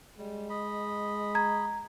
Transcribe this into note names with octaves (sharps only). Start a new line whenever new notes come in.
G3 G#3
D#5 B5
A#5 G#6